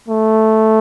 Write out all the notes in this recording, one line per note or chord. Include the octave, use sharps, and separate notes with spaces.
A3